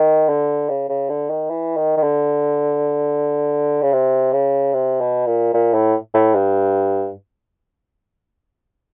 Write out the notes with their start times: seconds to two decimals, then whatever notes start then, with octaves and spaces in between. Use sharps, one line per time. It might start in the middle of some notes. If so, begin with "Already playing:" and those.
Already playing: D#3
0.29 D3
0.69 C#3
0.89 C#3
1.09 D3
1.30 D#3
1.50 E3
1.77 D#3
1.97 D#3
2.03 D3
3.82 C#3
3.92 C3
4.33 C#3
4.73 C3
5.00 B2
5.26 A#2
5.53 A#2
5.74 A2
6.14 A2
6.34 G2